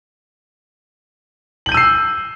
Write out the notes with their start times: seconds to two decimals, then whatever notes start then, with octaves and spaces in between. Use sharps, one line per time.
1.66 F#7
1.69 G6
1.72 D#7
1.74 E6
1.77 C7